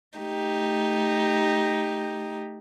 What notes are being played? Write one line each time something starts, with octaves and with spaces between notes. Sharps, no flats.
A3 D#4 G4